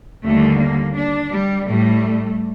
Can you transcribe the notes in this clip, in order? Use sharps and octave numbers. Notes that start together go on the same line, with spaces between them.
D#2 D3 G3 A3
A#3
D4
G3
A2 G3 A3